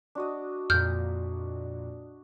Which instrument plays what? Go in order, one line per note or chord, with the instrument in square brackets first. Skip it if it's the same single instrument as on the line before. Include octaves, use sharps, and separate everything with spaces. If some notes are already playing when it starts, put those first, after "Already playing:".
[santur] D4 F#4 D#5
[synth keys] F2 A#2 [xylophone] F6 G6